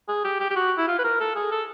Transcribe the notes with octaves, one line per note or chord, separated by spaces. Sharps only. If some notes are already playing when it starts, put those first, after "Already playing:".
G#4
G4
G4
G4
F#4
E4
F4
B4
A#4
A4
G#4
A4